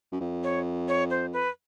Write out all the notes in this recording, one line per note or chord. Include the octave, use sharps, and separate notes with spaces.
F#2
F2
C#5
C#5
C5
B4